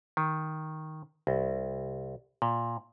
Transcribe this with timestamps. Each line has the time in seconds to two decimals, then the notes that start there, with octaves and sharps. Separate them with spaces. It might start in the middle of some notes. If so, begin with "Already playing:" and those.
0.17 D#3
1.27 C2
2.42 A#2